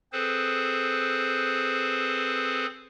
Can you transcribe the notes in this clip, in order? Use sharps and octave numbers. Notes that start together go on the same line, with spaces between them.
C4 G#4 A4 B4 C5